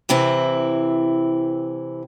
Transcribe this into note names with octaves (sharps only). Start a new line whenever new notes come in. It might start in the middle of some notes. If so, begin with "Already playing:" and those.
C3 E3 C4 E4